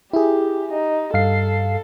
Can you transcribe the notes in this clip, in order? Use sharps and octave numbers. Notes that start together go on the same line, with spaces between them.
E4 G4 G#4
D#4
G2 A4 F5 C7